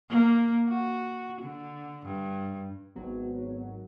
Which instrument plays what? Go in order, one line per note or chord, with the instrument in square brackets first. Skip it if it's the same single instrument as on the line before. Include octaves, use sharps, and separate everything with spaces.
[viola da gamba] A#3
F#4
D3
G2
[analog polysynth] G#1 F#3 [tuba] B3